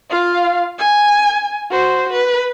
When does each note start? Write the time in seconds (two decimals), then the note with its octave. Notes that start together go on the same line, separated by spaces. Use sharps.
0.10 F4 F5
0.78 G#5
1.71 F#4 C5
2.12 B4